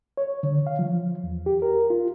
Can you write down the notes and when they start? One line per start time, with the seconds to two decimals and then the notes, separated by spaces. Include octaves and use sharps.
0.17 C#5
0.43 D3
0.67 F5
0.79 F3
1.24 E2
1.46 G4
1.62 A#4
1.90 F4